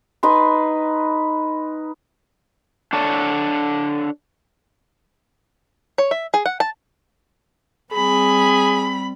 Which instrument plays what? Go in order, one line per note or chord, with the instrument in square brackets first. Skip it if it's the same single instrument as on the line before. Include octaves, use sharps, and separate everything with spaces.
[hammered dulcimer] D#4 B4 G#5 C6
[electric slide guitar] D4 A4 C#5
[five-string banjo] C#5
E5
G#4
F#5
A5
[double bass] G3 C4 [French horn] G#4 [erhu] B5